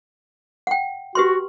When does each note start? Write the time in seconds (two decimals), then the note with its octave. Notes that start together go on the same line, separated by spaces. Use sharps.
0.67 F#5 G5
1.15 F#4 G4 B4 C6